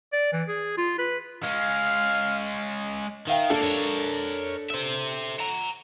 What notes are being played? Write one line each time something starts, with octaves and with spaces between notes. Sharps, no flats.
D5
E3
G#4
F4
B4
G#3 C#4 F5
D#3 E5 F5 G5
A3 A#3 D4 A4
A#4 C#5
C5 E5
F#5 A#5